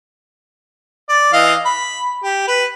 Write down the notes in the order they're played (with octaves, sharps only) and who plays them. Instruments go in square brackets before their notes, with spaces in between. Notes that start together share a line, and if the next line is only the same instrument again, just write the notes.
[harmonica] D5
E3 D#5 F5
B5
G4
B4